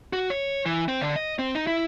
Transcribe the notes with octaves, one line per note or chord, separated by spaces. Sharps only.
F#4
C#5
E3
C4
D3
D#5
C4
D#4
E4